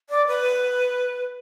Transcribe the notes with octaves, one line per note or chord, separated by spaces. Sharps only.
D5
B4